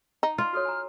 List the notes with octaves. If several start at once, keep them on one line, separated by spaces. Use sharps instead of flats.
D#4
F4
F#4 A4 C#5 F6
G#5 A#5